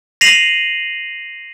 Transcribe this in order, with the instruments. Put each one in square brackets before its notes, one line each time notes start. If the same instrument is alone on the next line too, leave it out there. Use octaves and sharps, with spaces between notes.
[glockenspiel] A#6 C7 D#7 F7 F#7